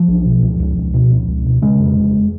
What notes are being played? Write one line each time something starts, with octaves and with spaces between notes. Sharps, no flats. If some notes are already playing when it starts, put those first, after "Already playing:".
Already playing: F3
B1
B2
C#2
C#2
C#2
B2
C#2
C#2
B2
C#3 G#3
F2
F1